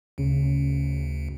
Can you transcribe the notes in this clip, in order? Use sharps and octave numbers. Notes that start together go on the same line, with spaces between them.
D2 C#3